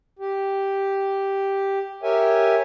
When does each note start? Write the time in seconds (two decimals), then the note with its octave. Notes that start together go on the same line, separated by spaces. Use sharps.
0.19 G4
2.03 G4 A#4 C#5 E5 G#5